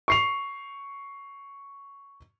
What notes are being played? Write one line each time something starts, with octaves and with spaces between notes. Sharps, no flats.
C#6 C7 F7